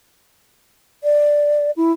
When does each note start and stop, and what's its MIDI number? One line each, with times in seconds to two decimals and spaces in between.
1.04 1.71 74
1.77 1.92 64